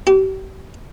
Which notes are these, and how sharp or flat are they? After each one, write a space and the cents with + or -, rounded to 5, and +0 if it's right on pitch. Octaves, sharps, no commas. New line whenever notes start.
G4 -40